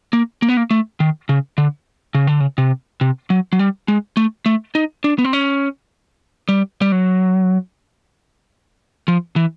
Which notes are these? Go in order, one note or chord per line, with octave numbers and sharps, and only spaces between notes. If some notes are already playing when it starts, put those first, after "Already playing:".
A#3
A#3
B3
A#3
A3
D#3
C#3
D3
C#3
D3
C#3
C3
C3
F#3
F#3
G3
G#3
A3
A3
D#4
D4
B3
C4
C#4
G3
G3
F#3
F3
E3